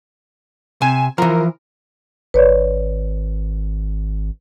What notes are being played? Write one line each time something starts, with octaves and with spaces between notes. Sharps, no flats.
C3 G#5 E7
E3 F3 A#4
G#1 B4 C#5 D5